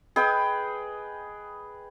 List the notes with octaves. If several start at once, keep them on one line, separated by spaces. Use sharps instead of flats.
G#4 B4 D#5 G5